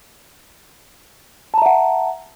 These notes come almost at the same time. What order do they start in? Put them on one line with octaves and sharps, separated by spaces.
A5 A#5 E5 F#5